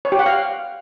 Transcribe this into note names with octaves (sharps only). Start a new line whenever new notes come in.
C#5
G4
F#5
F5